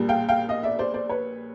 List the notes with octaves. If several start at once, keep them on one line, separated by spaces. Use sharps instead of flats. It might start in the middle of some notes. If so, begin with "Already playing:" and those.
Already playing: A#1 A#2 G3
F5 G5
F5 G5
D#5 F5
D5 E5
C5 D5
C5 D5
B4 C#5